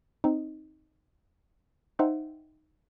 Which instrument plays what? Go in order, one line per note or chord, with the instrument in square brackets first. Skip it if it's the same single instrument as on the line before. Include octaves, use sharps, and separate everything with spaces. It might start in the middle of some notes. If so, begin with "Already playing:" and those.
[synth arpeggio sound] C4 D#4
D#4 C5 E5 F#5 G5